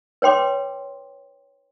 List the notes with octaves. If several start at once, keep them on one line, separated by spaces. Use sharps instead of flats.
B4 C#5 G5 C6 D6